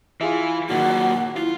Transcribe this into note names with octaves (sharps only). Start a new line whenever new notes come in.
E3 F4 G#4 E5
A#2 D#3 F#3 F#4 F#5
E4 F4